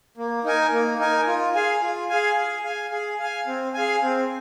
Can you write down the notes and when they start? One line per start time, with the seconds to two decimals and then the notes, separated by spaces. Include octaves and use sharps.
0.17 A#3
0.45 D#4 A#4 G#5
0.72 A#3
0.99 D#4 A#4 G#5
1.27 F4
1.55 G#4 F5 G#5
1.82 F4
2.09 G#4 F5 G#5
2.37 G#4
2.64 F5 G#5
2.92 G#4
3.20 F5 G#5
3.47 C4
3.74 G#4 F5 G#5
4.02 C4